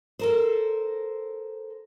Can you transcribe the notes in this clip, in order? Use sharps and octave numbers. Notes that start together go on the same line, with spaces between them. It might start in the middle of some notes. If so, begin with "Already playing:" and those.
A4 A#4 C5